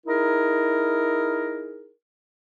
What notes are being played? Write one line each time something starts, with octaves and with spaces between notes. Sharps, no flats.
D#4 E4 G#4 A#4